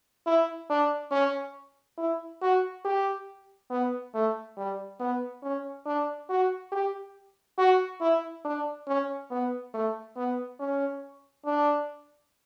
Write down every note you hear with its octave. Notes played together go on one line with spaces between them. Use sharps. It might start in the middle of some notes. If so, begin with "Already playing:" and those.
E4
D4
C#4
E4
F#4
G4
B3
A3
G3
B3
C#4
D4
F#4
G4
F#4
E4
D4
C#4
B3
A3
B3
C#4
D4